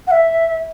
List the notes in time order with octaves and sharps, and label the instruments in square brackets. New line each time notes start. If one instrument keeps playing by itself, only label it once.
[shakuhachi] F#5
E5